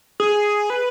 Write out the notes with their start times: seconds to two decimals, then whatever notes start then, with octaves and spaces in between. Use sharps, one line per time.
0.20 G#4
0.70 B4